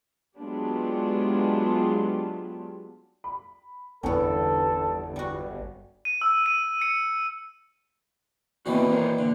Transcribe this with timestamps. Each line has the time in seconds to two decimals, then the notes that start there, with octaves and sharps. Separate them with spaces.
0.37 F#3 G#3 B3 D4 F4 G4
3.24 B5
4.03 G1 E2 D3 B3 C#4 A4
5.16 G3 F#4
6.05 D#7
6.22 E6
6.46 D#7
6.82 C#7
8.66 A#2 D#3 E3 B3 C4 F#4
8.91 A#4 C5 C#5
9.19 A#2 D3